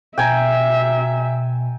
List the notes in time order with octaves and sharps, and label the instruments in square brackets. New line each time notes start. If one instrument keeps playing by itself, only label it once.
[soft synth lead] B2 [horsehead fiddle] E5 [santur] G5 G#5 A#5